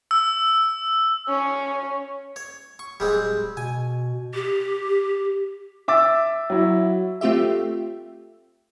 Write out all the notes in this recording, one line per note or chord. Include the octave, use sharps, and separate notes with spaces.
E6
C#4
C#5
C#6
D1 G3 G#3 C4
B2 G#5
G4
E5 D6 E6 A6
F#3 E4
A3 C4 F4 G4 E5